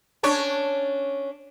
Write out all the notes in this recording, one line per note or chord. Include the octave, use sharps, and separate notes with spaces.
C#4 D4 C#5